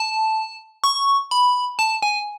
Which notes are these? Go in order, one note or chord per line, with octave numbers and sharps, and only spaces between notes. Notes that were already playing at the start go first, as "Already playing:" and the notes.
Already playing: A5
C#6
B5
A5
G#5